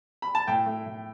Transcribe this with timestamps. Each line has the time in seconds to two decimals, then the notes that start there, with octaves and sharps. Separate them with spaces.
0.22 B5
0.35 A5
0.47 A2 G5
0.66 A3
0.86 A2